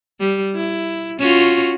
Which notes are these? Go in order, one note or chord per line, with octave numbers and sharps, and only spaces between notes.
G3
E4
C#4 F4 F#4